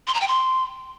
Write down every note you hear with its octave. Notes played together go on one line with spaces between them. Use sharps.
C6
A#5
G5
C6